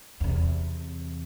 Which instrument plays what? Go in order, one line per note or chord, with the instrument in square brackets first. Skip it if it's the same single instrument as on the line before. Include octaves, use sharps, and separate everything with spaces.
[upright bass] E2 C3